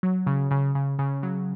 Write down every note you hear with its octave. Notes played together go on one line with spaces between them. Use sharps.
F#3
C#3
C#3
C#3
C#3
F#3